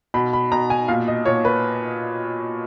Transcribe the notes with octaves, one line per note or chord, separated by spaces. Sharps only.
B2 B5
B5
B2 A#5
G#5
A#2 F5
D#5
A#2 C#5
B4